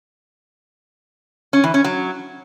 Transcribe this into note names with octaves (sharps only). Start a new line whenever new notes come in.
C#4
E3
C#4
F#3